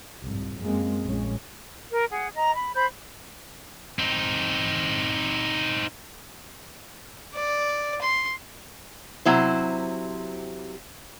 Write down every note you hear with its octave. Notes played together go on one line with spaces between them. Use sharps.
C2 F2 G#2
F#2 G#3 A#3 C4
A#1 A#2 G#3 C#4
A#4
G#4 F#5
D#5 A#5
B5
C5 B5 G6
C4 D#4
D5
C6
C3 F#3 E4 C5